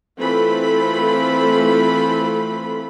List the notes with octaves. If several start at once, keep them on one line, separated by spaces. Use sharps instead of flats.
E3 A3 C4 F4 A4 B5